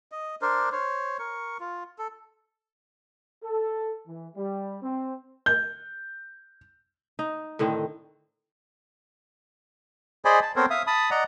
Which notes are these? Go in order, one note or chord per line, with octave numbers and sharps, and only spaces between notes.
D#5
D4 A#4 C5
C5 C#5
A#4 C#6
F4
A4
A4
E3
G3
C4
G6
D#4
A2 D3 D#3 C4
G#4 C5 D5 D#5 G#5 B5
A5
B3 C4 A4 A#4 C5 C#5
E5 F5 D#6
A5 B5 D#6
D5 D#5 F#5 A#5